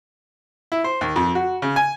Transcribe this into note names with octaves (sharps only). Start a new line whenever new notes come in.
E4
C5
D#2
F2
F#4
C#3
G#5